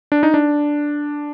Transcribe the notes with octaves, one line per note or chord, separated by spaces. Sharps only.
D4
D#4
D4